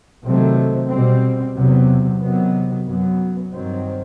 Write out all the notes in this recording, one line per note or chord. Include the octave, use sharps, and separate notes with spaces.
C3 D#3 F#3 A3 C4
B2 G3 C4
E2 C3 F#3 B3
C3 D#3 F#3 B3
F#2 F#3 B3
G2 D#3 F#3 C4